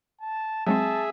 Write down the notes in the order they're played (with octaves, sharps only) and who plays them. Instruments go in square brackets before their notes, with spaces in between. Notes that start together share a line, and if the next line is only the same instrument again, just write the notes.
[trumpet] A5
[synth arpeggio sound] F#3 G#3 C4 [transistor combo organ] G#4 E5 [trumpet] A5